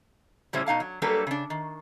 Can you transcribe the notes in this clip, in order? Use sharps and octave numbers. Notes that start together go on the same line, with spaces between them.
A2 C#3 G3 C#4 E4 C5
B2 D#4 F5 A5
F#3
F#3 G3 A#3 D4 A4 B4
C#3 D4
D#3